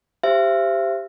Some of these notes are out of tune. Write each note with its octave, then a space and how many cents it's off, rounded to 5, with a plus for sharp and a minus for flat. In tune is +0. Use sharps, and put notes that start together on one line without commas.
G4 +0 C5 +0 E5 +40